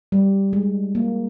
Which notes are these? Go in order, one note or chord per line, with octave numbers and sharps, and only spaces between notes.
G3
G#3
A#3